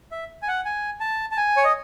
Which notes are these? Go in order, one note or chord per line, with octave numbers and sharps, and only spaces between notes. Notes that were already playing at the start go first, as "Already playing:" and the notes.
E5
G#5
F#5
G#5
A5
A5
G#5
C#5
D#5